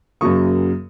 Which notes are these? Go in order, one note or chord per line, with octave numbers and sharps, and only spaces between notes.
F#2 C#3 F#3 A#3 C#6 D#6